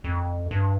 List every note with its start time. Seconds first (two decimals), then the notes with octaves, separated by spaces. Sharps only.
0.04 F2
0.51 G2